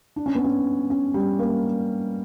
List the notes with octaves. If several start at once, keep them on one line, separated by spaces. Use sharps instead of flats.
D4
C#4
B3
C#4
C#4
G3
A#3